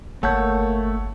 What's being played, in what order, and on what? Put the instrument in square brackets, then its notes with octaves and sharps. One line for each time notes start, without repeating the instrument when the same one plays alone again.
[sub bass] G1 [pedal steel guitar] A3 G6 [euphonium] A#3 [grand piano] C#5 F#5 A5